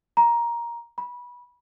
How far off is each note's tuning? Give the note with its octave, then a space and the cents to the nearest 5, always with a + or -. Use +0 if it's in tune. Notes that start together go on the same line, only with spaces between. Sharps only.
A#5 +15
B5 -20